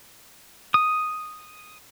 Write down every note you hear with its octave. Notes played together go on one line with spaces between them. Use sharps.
D#6